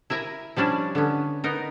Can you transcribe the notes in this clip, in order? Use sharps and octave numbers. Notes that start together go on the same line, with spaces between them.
E4 A#4 E5 G#5 A#5
F3 G3 C#4 D4 E4
D3 B3 C#4
B3 D#4 A#4